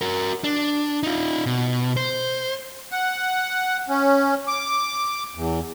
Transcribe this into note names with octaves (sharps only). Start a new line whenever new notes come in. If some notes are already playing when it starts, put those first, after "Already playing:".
F#4 A#4
D4
D#4 F4
B2
C5
F#5
C#4
D6
E2